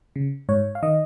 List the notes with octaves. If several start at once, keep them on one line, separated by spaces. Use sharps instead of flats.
C#3
G#2 C#5
F5
D#3 D#5